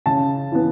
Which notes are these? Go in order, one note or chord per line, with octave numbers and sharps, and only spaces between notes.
C#3 A5
E3 B3